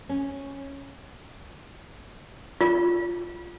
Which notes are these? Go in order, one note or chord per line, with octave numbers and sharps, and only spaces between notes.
C#4
F4